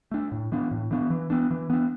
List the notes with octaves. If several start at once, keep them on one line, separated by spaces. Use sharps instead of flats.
A3 D4
A2
E3 B3 D4
A2
E3 B3 D4
E3
B3 D4
E3
B3 D4